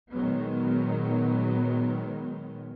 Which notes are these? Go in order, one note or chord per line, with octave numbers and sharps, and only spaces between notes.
A#2 D#3 F#3 G#3 B3